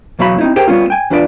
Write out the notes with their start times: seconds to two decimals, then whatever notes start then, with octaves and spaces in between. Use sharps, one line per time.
0.19 E2 B2 F#3 F5 A#5 B5
0.38 C4 D#4 E4
0.56 G4 G#4 A#4 C5 G5
0.68 G3 B3 C#4 F4
0.90 G5 G#5
1.10 E2 D4 F4 B4 D5